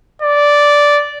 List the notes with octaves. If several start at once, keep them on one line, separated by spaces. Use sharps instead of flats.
D5